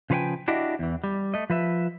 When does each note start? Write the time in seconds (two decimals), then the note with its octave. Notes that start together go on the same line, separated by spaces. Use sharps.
0.10 C#3 F3 B4 C#5 G5 G#5
0.48 D4 E4 F#4 G4 D#5 E5
0.79 E2 E3
1.04 G3
1.34 A3 D#5
1.50 F3 B4 E5